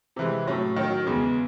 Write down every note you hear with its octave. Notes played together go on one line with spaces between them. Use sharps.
C3 E3 G#3
A2 F#3 C#4
D#3 F#3 C#4
E2 C#3 G#3